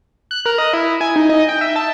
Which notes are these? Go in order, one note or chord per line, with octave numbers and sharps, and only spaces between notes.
F#6
A#4
D#5
E4
G#5
D#4
D#5
G5
E5
A5